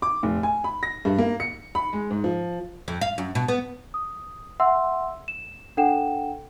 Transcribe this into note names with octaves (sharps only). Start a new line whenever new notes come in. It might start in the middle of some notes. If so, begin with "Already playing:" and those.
D6
F1
G#5
B5
A#6
G2
A#3
C#7
B5
G#3
G#2
F3
F2
F5
F#2
B2
B3
D#6
E5 F#5 C6 E6
E7
D4 A4 F#5 G5 E7